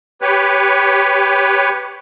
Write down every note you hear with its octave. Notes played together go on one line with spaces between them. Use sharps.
G4 B4 C#5